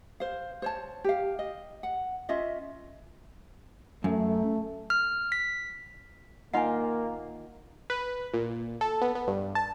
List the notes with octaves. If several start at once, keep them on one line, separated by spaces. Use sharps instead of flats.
C5 F5
C5 C#5 A5
G4 F5
D#5
F#5
C#4 F4 D#5 E5
F#2 A3
F6
B6
D#3 A#3 F4 F5 F#5 G#5
B4
A#2
A4
B3
B3
G2
A5